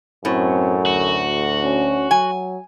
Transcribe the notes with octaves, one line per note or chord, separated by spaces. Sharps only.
F#2 A2 C4
D2 F#4
C#4
F#3 G#5